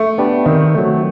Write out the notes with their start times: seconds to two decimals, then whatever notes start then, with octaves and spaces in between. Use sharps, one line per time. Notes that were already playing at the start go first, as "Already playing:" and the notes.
Already playing: A3
0.18 B3 D4 G4 B4
0.45 D#3 C4
0.75 F#3 A3